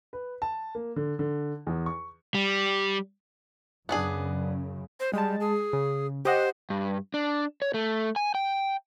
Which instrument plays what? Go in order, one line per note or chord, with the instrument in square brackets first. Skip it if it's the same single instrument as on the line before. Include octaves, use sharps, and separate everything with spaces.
[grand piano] B4
A5
A#3
D3
D3
E2
C#6
[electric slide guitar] G3
[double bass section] F#2 C#3 [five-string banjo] B3 D4 G#4
[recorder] C5
[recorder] G3 [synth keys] G#3 A5
[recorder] G#4
[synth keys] C#3
[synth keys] G4 D#5 F#5 [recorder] C5
[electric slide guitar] G2
D4
C#5
A3
G#5
G5